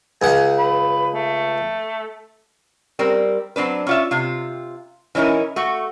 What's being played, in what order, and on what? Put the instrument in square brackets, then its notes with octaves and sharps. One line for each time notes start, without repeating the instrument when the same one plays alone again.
[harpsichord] C#2 F#5 [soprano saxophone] G#5
[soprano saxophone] B4
A3
[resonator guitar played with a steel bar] G3 C4 A#4
F#3 C4 D4 B4
C#4 F4 E5
C3 F4
E3 C#4 D#4 E4 A#4
A3 F#4